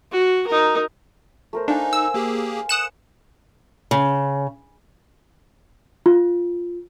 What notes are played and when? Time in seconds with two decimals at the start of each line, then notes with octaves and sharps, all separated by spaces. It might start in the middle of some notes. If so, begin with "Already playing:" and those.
0.11 F#4
0.47 D#4 A#4
1.53 A3 A#4 C5
1.68 D4 D#4 F5 G#5
1.93 E6
2.14 A#3 G4 G#4
2.69 D#6 F#6 C#7 E7
3.91 C#3
6.06 F4